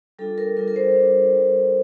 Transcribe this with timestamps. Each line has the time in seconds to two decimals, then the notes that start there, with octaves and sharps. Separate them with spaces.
0.19 G3 D4 F4 A4
0.38 A#4
0.57 G3 D4 F4 A#4
0.68 A#4
0.76 C5
0.95 G3 D4 F4
1.35 G3 D4 F4